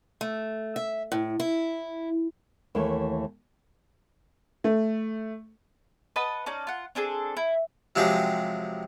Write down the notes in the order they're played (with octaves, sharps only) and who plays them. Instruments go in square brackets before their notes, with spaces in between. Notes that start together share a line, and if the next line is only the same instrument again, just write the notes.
[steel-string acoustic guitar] A3
E5
A2
E4
[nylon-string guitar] D#2 E3 A3 C#5
[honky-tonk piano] A3
[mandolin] B4 D#5 F#5 A5
C#4 D#4 D5 A5
F4 F#5
C4 D4 G#4 A4
E4
[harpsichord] C3 F3 F#3 G#3 G4 G#4